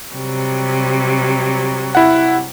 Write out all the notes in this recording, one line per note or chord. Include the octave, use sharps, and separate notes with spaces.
C3 F#3 G3
E4 F#5